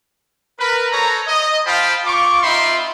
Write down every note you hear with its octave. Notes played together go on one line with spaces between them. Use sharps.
A#4 B4
A4 C5 C#5 A#5
D#5
F4 C5 F5 G5 A5 B5
F4 C#6 D6
C4 D#4 F4 E5 B5 C6